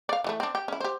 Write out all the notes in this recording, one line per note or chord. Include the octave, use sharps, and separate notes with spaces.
D5 F5
E3 G3 A3
C4 D4
G4
C#4 E4
G4 C5